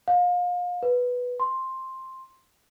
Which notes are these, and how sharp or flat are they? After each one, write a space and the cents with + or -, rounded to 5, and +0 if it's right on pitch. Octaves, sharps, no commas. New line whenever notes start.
F5 +30
B4 -5
C6 +10